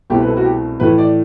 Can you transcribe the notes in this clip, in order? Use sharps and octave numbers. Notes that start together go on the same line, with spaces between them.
C2 B2 A3 C4 E4 G4
B4
A4
F#4
G4
A2 E3 A3 B4
D5